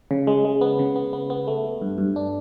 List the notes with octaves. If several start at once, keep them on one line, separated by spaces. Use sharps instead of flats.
C#3
G#3
G#3
B3
C#3
B3
B3
B3
A3
A3
G2
G2
D4